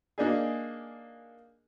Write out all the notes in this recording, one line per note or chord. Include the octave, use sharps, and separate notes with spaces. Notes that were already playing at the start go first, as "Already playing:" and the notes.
A#3 D4 D#4 G#4